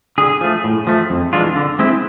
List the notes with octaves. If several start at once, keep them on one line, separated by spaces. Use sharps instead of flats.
D3 G#4
F3 A3
A2
F3 A3
F2
E3 G#3 D4 F4
D3
G#3 C4 E4